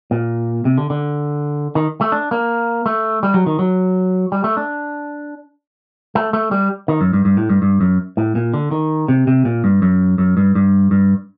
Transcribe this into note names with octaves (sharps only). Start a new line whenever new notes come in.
A#2
C3
D3
D3
D#3
A3
D4
A#3
A3
G3
F#3
D#3
F#3
G3
A3
D4
A3
A3
G3
D#3
F#2
G2
G2
A2
G2
G2
F#2
A2
A#2
D3
D#3
C3
C3
A#2
G2
F#2
F#2
G2
G2
G2